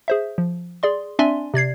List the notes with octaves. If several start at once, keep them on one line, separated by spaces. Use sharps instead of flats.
G#4 C5 E5
F3
G#4 D5 C6
C4 D4 D5 E5 G#5 C6
C3 D5 G#6 C7